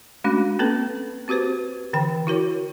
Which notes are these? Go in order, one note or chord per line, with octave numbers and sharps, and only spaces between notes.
G#3 A3 C#4 D4 F#4
A#3 C4 C#4 A4 B4
C4 F#4 G4 B4 C5
D3 E3 G5
E4 F#4 A#4 C#5